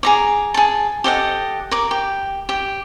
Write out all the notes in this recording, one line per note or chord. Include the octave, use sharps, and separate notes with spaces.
G#4 A#5 D6
G#4 A5
G4 A4 D#5 F#5
A#4 D6
G4
G4